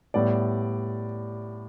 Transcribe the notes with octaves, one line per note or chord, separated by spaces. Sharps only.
A2 G3 B3 D5